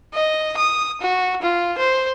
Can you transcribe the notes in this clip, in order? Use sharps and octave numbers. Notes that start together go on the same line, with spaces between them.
D#5
D#6
F#4
F4
C5